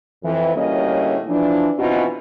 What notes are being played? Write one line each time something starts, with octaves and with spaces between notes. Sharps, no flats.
F2 E3
D2 A2 G3 A#3 C#4 D#5
E3 F3 D4
B2 E3 C4 D#4 F4 F#4